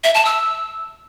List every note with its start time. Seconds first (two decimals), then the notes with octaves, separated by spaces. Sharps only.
0.04 E5
0.14 A5
0.25 E6